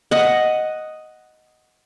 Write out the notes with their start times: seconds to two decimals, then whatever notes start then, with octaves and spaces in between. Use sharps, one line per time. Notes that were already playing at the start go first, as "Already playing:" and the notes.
0.11 D#5 F#5